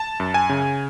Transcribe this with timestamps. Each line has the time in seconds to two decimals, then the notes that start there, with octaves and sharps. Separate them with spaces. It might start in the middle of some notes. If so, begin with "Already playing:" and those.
Already playing: A5
0.20 F#2
0.34 G#5
0.49 C#3